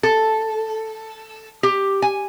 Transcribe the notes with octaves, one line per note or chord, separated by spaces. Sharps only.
A4
G4
G#5